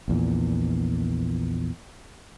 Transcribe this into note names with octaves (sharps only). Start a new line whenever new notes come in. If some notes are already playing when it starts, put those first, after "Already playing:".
A#1 E2 A#2